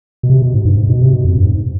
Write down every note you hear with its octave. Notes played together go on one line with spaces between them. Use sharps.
B2
C3
B2
G#2
G2
G#2
B2
C3
B2
F2
G2
G#2